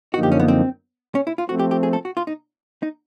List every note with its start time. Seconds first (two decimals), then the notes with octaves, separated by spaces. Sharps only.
0.14 F#2 D3 F3 A#3 D#4 F#4
0.23 G4
0.32 C#4
0.40 B3
0.48 C4
1.15 C#4
1.27 E4
1.38 F4
1.49 F3 A3 C4 F#4
1.59 G4
1.71 G4
1.83 G#4
1.93 A4
2.05 F#4
2.17 F4
2.27 D#4
2.83 D#4